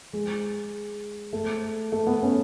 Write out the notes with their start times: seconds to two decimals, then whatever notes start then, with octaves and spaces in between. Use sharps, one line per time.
0.13 G#3
1.33 A3
1.92 A3
2.07 B3
2.23 C#4